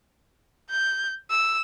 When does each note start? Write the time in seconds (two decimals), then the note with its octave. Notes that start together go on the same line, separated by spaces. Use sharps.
0.69 G6
1.30 E6